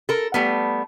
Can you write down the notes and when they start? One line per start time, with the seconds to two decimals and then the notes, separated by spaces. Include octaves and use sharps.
0.09 A4 A#4
0.34 G3 A3 B3